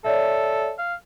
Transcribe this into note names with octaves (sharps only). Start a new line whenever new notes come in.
A4 C#5 D5 E5
F5